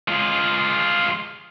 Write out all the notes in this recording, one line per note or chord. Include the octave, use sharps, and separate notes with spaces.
G#3 F4